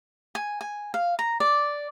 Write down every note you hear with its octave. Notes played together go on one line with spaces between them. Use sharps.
G#5
G#5
F5
A#5
D5